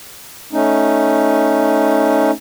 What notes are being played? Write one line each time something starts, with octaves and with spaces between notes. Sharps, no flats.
A3 C#4 D#4